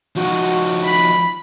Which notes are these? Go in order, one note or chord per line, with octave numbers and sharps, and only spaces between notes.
F3 D#4 F#4
B5